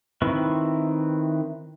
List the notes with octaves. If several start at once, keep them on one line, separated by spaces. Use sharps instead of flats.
D#3 C4 E4 B4 C#6